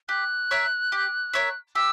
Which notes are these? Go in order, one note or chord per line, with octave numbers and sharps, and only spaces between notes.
G4 F#6
A#4 C#5 E5
G4
A#4 C#5 E5
G4 E6